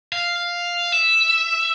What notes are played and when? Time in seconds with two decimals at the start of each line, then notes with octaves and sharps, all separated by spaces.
0.12 F5
0.92 E5